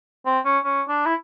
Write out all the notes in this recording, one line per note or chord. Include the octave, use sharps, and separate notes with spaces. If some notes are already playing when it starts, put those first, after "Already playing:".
C4
C#4
C#4
D4
E4